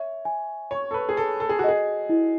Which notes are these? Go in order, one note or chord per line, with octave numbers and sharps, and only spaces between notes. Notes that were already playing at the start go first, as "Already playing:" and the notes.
Already playing: C#5 E5
G#5
C#5 C#6
A4
B4
G#4
A4 C#5
A4
G#4
F#4
G#4 D#5
E4